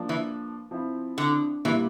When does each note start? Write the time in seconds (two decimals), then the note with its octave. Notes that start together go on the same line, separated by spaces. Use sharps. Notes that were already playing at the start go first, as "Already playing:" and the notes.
Already playing: F3 A#3 D4
0.09 E3
0.71 F3 C4 E4
1.18 D3
1.65 A#2 E3 G3 A#3 E4